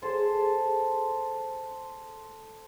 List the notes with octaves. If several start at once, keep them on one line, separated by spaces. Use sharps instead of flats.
G#4 A4 C5 A5